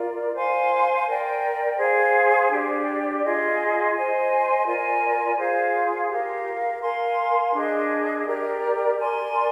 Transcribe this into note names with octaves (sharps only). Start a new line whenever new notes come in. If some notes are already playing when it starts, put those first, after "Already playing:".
Already playing: F4 A#4 D5
C5 F5 G#5 C6
A#4 D5 G5
G#4 C5 F5
D4 G4 D5
F4 G#4 D#5
C5 D#5 G#5
F4 A#4 D5 G#5
F4 G#4 C5 F5
G4 A#4 F5
A#4 F5 G#5 C6
D4 G#4 D#5
G4 A#4 D5
A#4 D5 G#5 C6